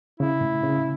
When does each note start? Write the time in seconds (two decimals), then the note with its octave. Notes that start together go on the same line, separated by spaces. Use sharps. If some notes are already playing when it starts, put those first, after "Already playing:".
0.20 C#3 E4
0.41 A2
0.63 C#3